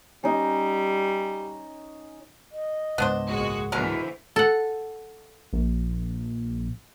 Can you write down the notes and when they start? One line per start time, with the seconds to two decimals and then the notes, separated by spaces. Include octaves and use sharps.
0.24 G3 C#4 D#4
2.52 D#5
2.98 C#2 G#2 B3 D4 C5
3.28 A#1 G#3 F#4
3.72 B2 D3 E3 F#3 G#3 A#4 C5
4.36 A4 F#5
5.53 A#1